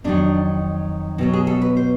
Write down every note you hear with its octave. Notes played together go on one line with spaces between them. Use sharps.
F2 C3 D#3 F#3 D4
B2 F#3 B3 E4
G#4
A4
B4
C5